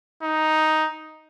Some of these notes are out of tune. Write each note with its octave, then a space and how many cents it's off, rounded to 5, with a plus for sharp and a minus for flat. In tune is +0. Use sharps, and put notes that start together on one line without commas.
D#4 +5